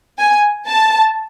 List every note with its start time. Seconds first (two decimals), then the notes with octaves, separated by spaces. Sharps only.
0.18 G#5
0.67 A5